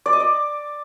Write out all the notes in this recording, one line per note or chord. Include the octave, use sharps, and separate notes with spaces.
D5
D#5
D5